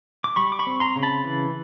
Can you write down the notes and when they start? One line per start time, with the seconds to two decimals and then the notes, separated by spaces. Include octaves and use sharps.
0.24 D6
0.36 G3 B5 C#6
0.52 D6
0.59 B5 C#6
0.67 C4
0.80 A#5 C6
0.96 C#3
1.03 A5 B5
1.24 E3